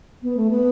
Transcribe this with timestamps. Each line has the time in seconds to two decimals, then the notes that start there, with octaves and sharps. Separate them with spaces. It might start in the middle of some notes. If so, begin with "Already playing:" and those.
0.23 B3
0.37 A3
0.50 B3